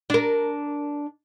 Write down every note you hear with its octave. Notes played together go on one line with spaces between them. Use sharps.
D4 A#4